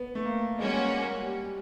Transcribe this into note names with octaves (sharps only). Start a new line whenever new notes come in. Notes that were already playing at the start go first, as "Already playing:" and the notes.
Already playing: B3
A3
A#3
G3 G#3 A#3 C#4 F#4
G3